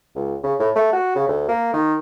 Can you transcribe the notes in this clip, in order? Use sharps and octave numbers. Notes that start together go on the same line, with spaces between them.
C#2
C#3
A2
A3
F#4
C#3
D2
A#3
D#3